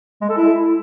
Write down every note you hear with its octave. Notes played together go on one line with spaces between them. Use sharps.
G#3
A4
E4